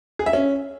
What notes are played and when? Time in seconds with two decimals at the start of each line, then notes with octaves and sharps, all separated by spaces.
0.19 G#4
0.26 E5
0.33 C#4